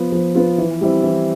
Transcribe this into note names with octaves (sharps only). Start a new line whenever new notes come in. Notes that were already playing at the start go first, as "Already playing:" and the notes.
Already playing: F3 B3 F4
F3
B3 F4
E3
G3 C4 E4
E3